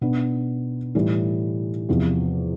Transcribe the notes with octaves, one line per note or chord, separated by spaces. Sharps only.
B2 B3 D4
A2 E3 G3
E2 C3 F3